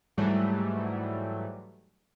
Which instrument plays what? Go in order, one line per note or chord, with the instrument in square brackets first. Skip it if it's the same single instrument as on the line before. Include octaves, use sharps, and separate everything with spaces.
[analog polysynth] G#2 E3 F#3 G3 A3